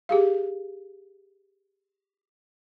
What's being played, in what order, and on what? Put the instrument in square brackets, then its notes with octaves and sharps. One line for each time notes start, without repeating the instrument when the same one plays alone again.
[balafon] G4 G#4 F5